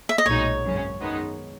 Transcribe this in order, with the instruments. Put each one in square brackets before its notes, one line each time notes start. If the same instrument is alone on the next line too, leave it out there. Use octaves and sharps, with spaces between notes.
[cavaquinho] E5
D#5
[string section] B1 A#2 G#3 D#4 F#4 [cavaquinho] C#5
[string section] G#1 F#2 C#3 F#3 C#4
F#2 D#3 G#3 B3 D#4